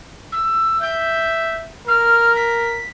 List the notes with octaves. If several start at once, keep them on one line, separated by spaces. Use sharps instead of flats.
E6
E5 G6
A#4 F6
B6